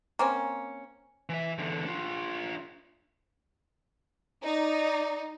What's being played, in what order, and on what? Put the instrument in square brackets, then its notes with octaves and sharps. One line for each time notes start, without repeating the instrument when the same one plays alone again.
[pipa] A#3 C4 C#4
[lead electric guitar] E3 E5
E2 D3
D4 F4
[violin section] D#4 [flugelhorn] D5